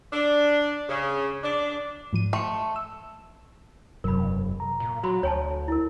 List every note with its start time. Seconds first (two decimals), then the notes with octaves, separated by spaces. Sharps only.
0.13 D4
0.89 C#3
1.44 D4
2.13 G#2 F3 D#7
2.33 A3 C6 C#7
2.76 E6
4.04 E1 F#2 C3 F#3 A#4 B5
4.60 A#5
4.80 A#2
5.03 F#3 F#4 B5 C6
5.23 D2 C#5 G#5 A5
5.68 E4 A#4